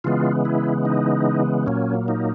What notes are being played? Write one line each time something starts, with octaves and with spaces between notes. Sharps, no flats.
C#3 E3 G#3 B3 F4
E4
D#4
A#2 F#3 A#3 C#4
D#4